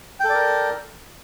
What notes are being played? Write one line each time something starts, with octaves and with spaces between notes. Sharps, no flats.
A4 A#4 D5 G5